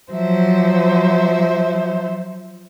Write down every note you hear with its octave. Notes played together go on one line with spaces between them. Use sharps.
F3 F#3 C5 E5